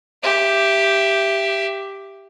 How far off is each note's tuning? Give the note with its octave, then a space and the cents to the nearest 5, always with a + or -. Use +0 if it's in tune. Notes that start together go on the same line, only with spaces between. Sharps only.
G4 +0 E5 +20